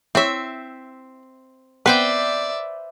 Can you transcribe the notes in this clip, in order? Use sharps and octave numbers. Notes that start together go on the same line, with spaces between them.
C4 E4 C#5 E5
B3 C4 B4 C5 D5 E5 G5